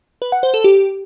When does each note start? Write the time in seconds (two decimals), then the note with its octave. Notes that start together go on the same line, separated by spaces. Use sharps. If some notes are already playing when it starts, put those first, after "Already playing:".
0.22 B4
0.32 F#5
0.43 C5
0.54 A4
0.64 G4